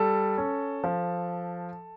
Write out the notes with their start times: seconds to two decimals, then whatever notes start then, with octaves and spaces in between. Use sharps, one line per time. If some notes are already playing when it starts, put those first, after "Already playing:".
Already playing: G3 A4
0.38 C#4
0.84 F3